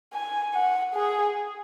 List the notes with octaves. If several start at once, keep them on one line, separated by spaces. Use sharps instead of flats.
G#5
F#5
G#4